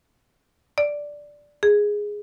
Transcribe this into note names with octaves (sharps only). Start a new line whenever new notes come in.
D5
G#4